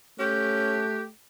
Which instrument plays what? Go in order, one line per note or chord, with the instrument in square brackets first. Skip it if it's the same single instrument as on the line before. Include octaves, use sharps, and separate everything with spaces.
[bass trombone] A3 [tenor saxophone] C#4 [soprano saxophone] G4 [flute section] C#6 F#6 G6